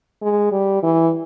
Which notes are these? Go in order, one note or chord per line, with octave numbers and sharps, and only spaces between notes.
G#3
G3
E3